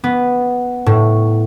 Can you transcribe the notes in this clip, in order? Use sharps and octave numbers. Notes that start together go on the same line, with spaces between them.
B3
A2